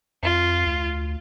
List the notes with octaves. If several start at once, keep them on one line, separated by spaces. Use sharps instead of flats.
F2 F4
D2